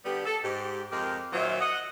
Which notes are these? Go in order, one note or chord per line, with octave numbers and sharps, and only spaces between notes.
D3 G3 B3 G4
A4
G#2 G4
F2 G#3 G4 A#4
A#2 D#3 F#3 F4 C5 E5
D#5 F#5